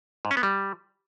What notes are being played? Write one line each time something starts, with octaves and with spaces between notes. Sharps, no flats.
G#2
C#4
B3
G3